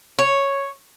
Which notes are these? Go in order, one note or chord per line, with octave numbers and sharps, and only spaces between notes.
C#5